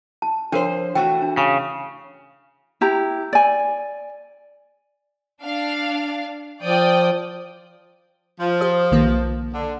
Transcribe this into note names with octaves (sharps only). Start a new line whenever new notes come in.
A5
F3 D4 A#4 C5 C#5
E3 A3 F#4 G5
D4
C#3 C#6
E4 G4 A#5
D5 G#5
D4 F5
F3 D5 G5 D#6
F3
G4 C5 D#6
B1 D#3 A#3
D3